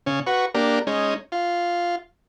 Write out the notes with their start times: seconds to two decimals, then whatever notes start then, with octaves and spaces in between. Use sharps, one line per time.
0.06 C#3 C#4
0.27 F#4 B4 C#6
0.55 A#3 D4 G4 A#4
0.87 G#3 C#4 D#4
1.32 F4